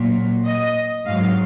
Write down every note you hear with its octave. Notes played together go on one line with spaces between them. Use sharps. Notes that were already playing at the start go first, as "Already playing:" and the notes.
Already playing: A#2 F#3
D#5
G#2 F#3 F5